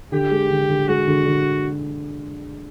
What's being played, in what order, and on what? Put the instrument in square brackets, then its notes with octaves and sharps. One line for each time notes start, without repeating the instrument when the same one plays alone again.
[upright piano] D3 [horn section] G4
[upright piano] G#3
D3
D3
[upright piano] G#3 [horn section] F#4
[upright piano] D3
D3